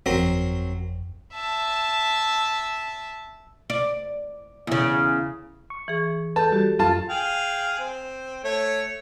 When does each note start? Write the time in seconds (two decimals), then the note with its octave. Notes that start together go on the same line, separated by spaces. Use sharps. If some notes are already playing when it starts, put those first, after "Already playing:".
0.06 G1 F2 F#3 C4 A#4
1.34 E5 A5
3.70 D5
4.67 E2 C#3
5.70 C#6
5.88 E3 G#4
6.36 A4 B4 A5 G6
6.52 G3 F#4 G4
6.79 F#2 F4 A5
7.09 G#4 F5 G5
7.80 C4
8.44 A3 C#5